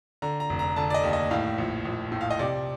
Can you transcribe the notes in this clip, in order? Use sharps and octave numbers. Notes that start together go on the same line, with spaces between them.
D3 A#5
A#5
F1
A#5
D3 A5
D5
D#5
D#2
D#5
A2 F5
A#1
A#1
A2
F5
D#5
C3 D5